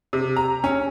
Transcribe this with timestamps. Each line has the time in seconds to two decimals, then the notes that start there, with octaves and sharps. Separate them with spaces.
0.13 C3
0.37 A#5
0.64 C#4